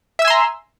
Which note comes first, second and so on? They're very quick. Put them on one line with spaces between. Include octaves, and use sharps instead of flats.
E5 E6 G#5 C6 A#5